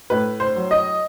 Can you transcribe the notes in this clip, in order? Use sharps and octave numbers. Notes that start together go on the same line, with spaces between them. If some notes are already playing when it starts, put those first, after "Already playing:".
A2 B4
C5
F#3
D#5